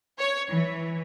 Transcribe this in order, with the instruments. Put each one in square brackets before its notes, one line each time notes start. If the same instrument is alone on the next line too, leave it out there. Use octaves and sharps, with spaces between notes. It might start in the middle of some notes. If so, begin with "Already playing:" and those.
[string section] C#5
E3